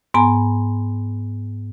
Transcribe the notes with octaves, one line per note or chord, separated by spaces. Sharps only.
G#2 B3 G#5 A#5 C6